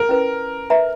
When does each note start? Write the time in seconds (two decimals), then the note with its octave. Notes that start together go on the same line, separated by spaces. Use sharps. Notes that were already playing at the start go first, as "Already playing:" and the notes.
Already playing: A#4
0.09 C#4 E4 B4
0.70 B4 E5 A#5